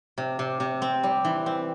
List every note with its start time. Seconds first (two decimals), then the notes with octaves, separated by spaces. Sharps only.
0.18 C3
0.39 C3
0.60 C3
0.82 C4
1.03 G3
1.25 E3
1.46 C4